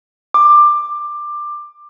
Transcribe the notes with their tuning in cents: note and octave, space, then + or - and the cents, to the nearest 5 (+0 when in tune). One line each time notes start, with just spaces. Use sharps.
D6 +15